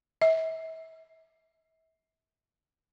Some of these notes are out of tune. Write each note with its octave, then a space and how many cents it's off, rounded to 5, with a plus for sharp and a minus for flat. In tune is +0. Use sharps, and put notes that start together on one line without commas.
E5 -35